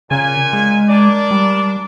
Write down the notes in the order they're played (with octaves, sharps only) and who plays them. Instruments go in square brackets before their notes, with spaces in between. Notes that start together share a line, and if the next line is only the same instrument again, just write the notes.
[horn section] A#2 G#5 [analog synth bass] C#3
[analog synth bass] G#3
[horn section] D4 A#4 D5
[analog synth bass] G3